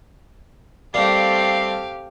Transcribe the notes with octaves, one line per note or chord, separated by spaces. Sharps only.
G3 A3 A#3 C4 G4 F5 C7